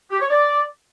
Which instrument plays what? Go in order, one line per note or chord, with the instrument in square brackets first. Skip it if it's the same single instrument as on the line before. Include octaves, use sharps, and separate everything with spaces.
[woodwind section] G4
C#5
D5